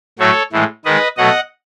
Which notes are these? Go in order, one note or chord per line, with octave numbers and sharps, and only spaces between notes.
A2 F#3 A3 A4 C#5
A2 E3 G#3
D#3 G#3 B4 D#5
B2 F#3 A3 D#5 F#5